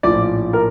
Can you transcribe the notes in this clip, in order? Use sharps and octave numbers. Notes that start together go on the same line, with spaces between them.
A#1 A2 F3 D5
A#4